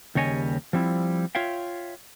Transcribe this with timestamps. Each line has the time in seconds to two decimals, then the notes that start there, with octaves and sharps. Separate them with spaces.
0.15 D#2 C#3 G3 C#5 D#5 G#5
0.73 F3 G3 C4 E4
1.35 F4 C#5 E5 F5 G5